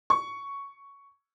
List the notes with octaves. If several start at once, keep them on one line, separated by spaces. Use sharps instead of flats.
C#6